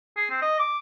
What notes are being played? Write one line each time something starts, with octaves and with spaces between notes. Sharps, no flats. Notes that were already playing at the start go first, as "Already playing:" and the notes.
G#4
C4
D#5
D6